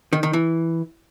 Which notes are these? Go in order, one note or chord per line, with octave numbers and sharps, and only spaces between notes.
D#3
D#3
E3